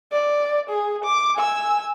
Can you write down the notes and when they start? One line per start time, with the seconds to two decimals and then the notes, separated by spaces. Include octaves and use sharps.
0.13 D5
0.70 G#4
1.05 D6
1.36 G#5 E6